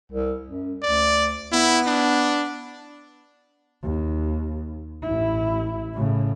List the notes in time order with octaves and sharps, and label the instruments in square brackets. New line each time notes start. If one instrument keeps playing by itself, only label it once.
[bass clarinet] C2
F#2
[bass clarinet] D2 [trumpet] D5
[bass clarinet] B3 [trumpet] E4
[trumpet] D4
[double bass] D#2
A1 E4
A2 C#3